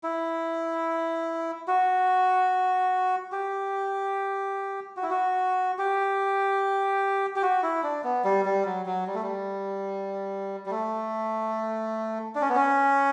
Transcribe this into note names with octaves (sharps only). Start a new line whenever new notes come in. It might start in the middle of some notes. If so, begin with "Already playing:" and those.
E4
F#4
G4
F#4
E4
F#4
G4
G4
F#4
E4
D4
B3
G3
G3
F#3
F#3
G3
A3
G3
G3
A3
D4
C#4
B3
C#4